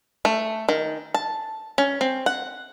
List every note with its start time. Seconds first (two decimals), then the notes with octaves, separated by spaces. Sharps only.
0.25 A3
0.69 D#3
1.14 A5
1.78 C#4
2.01 C4
2.26 F#5